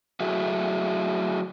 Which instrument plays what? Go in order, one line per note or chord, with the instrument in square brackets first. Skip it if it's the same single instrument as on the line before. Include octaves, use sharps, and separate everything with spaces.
[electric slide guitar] F#3 A3 E4 F#4 G#4